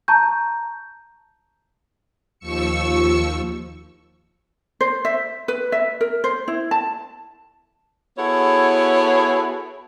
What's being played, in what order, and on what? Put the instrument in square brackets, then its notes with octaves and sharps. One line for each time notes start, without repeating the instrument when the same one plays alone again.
[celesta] A5 A#5 C#6 G6
[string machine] D#2 F3 C#6 E6 C#7
[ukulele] C5
E5
B4
E5
A#4
C5
E4
A5
[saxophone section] B3 E4 F#4 G#4 A4 C#5